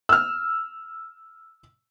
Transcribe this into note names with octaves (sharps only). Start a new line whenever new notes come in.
E6 F6